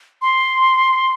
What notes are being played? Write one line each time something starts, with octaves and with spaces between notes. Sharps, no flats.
C6